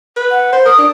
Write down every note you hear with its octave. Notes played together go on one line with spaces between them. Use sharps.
B4
F#5
C5
A#4 D#6
D4